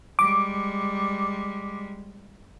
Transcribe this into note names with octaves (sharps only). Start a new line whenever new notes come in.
G3 G#3 D6